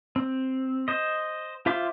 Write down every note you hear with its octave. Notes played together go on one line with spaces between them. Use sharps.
C4
C5 D#5
F4 C5 E5 C6 D6